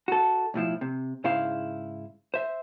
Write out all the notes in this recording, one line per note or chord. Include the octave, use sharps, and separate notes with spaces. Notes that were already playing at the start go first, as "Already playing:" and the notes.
F#4 A4
B1 A2 F3 E4
C3
G#2 C#3 E4 C5 F5
C5 E5